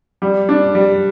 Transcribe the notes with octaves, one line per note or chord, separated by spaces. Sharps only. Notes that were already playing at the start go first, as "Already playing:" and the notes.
G3
D4
G3